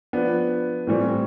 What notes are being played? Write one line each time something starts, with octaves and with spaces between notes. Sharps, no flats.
F3 B3 D4
A2 E3 G3 C4